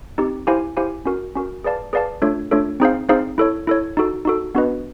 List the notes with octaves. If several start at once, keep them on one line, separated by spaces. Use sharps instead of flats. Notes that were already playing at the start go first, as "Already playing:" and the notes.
C4 D#4 G4
E4 G4 C5 F5 G#5
E4 G4 C5 F5 G#5
C#4 F#4 A#4
C#4 F#4 A#4
G#4 B4 D5 F5 A5
G#4 B4 D5 F5 A5
A3 D4 F4 A4 C#5
A3 D4 F4 A4 C#5
C4 D#4 G#4 C5 F5
C4 D#4 G#4 C5 F5
E4 A4 C#5
E4 A4 C#5
D#4 F#4 A4
D#4 F#4 A4
B3 D4 F#4 B4 D#5